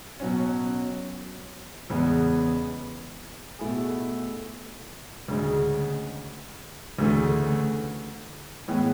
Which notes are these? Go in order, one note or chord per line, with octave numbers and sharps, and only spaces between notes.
B2 F#3 C#4
E2 C#3 G#3 B3
B2 A3 E4 G#4
D2 C#3 G#3
D2 C#3 E3 A3
A2 E3 G#3 B3